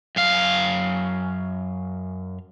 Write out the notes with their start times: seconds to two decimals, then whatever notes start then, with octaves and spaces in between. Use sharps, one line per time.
0.16 F#2 F5